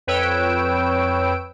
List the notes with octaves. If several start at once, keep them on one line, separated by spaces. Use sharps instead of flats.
F2 B4 C#5 G5 E6 D7